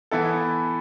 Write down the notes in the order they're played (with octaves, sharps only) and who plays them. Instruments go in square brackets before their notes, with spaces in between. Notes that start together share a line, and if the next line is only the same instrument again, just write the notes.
[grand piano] E3 B3 E4 A4